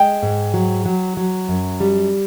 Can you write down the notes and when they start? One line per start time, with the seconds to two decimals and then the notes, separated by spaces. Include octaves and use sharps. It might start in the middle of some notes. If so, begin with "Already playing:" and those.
Already playing: G#3 G5
0.23 G#2
0.54 F#3
0.85 F#3
1.17 F#3
1.48 F#2
1.80 G3